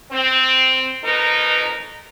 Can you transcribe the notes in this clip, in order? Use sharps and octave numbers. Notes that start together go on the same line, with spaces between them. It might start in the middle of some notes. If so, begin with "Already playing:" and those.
C4
F2 D#4 A#4 B4